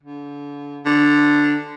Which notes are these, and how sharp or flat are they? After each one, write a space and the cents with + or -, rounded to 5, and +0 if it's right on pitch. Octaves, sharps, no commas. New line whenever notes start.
D3 -35
D3 +0